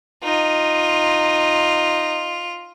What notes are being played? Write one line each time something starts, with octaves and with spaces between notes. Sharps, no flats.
D#4 F4